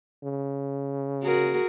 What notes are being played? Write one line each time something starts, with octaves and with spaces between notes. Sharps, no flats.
C#3
F#4 G#4 A#4